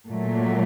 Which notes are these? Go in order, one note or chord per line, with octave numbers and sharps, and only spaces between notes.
A#2 F#3 A3